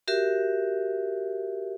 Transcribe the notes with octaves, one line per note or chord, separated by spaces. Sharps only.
F#4 G4 A#4 E5